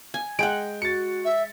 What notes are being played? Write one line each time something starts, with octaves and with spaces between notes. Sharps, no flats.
G#5
G#3 F#5 G5 D7
F#4 A6 C#7
E5